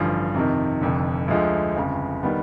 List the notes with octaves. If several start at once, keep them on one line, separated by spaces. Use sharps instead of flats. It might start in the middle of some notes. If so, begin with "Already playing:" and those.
Already playing: A1 G2 D3 F3
F2 C3 D#3
F1 F2 D3
D2 D3 F3 G#3
G1 F2 C#3
D#3 G3 B3